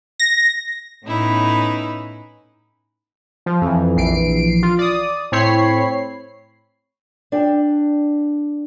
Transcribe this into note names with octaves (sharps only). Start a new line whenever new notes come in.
A#6
A2 B3 C#4 D#4 E4 B4
F3
F2 E3
A#1 E3 C7 D7
F4
D5 D#6
A2 C4 C#5 B5 C7
D4 G5